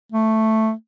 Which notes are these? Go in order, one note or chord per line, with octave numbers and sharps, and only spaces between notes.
A3